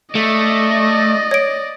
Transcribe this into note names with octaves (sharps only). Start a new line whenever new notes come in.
A3 D5 D#5
C#5 D7